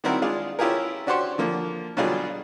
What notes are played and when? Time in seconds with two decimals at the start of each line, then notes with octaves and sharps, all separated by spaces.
0.04 D#3 G3 C4 E4 F#4 A#4
0.22 G#3 D4 F4 G#4
0.59 C#4 E4 F4 G4 G#4 A#4
1.06 C#4 D4 F#4 G4 C5 C#5
1.38 D3 F3 A#3
1.97 B2 D3 F#3 G3 F4 G#4